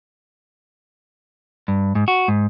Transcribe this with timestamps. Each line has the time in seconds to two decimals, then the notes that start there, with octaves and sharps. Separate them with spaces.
1.68 G2
1.95 G#2
2.08 F#4
2.28 G#2